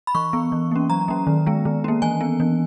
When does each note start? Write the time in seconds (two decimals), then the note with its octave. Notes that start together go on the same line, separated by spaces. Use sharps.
0.07 B5
0.15 E3 C#6
0.33 B3
0.52 E3
0.71 A#3 C#4
0.90 F#3 A#5
1.08 A#3 C#4
1.27 D#3
1.47 G#3 B3
1.65 D#3
1.84 A#3 C#4
2.02 E3 G#5
2.21 B3
2.40 E3